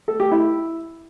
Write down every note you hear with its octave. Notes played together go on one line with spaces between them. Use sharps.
A4
G4
E4